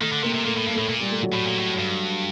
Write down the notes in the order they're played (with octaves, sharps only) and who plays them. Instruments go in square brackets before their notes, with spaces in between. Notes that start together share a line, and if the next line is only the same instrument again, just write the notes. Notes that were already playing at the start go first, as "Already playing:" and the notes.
[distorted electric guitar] D#3 [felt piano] A3
[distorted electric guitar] D3
[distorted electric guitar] C3 [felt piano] A#3
[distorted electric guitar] C3
[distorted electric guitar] A#2 [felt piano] A3
[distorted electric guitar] A2
G2
[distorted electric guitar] A2 [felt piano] A3
[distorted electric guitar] A#2
[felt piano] G3
A3
F#3
[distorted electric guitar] A2
A#2
A2
G2